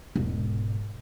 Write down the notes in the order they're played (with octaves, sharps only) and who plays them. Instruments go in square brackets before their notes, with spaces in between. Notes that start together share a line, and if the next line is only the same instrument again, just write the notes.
[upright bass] E1 G#2